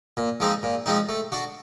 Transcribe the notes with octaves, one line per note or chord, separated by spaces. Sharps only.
A#2
F3 G#3 C4 D#4
A#2
F3 G#3 C4 D#4
A3
D4 F#4